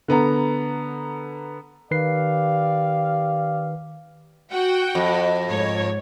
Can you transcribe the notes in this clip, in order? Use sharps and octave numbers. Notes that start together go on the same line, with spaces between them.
D3 B3 A#5
D#3 G4 B4 D5 F5 C7
F#4 F#5 G5
F2
G#2 C#5